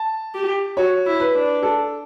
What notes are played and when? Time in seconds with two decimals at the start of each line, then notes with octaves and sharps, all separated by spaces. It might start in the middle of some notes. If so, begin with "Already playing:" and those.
Already playing: A5
0.34 G4
0.77 F#4 C#5
1.06 E4
1.20 B4
1.34 D4
1.62 A4